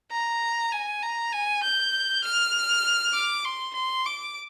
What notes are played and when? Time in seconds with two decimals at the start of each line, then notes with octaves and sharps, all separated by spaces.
0.11 A#5
0.72 G#5
1.02 A#5
1.33 G#5
1.63 G6
2.24 F6
3.14 D6
3.45 C6
3.75 C6
4.05 D6